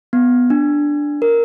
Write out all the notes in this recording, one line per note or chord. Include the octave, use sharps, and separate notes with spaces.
B3
D4
A#4